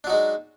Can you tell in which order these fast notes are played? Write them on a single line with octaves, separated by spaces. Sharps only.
D4 F#3 D#4 G#3